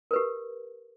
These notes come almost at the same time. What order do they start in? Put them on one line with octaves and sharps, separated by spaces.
A#4 B4 G4